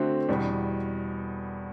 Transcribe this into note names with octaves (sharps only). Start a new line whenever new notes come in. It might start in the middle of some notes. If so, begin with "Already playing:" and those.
Already playing: D3 A3 C4 F#4
E2 B2 G3